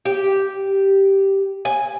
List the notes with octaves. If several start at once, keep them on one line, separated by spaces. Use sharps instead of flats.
G4
G#5